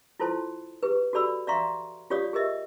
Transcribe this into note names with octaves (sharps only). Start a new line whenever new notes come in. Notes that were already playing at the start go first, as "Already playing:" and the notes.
E4 F4 A4 C5 A5 C6
G4 G#4 B4
F#4 G4 A4 D5 B5 E6
D5 E5 F5 A#5 C6 C#6
F4 G4 C#5 D5 F5 D#6
G4 G#4 A#4 D#5 E5